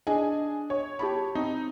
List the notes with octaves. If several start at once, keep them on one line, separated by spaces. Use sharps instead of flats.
D4 G#4 D#5 G#5
C#5
G4 A5 B5
C4 D#4